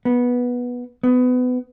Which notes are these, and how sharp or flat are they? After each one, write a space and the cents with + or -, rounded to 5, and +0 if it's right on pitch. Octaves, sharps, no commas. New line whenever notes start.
B3 -10
B3 +25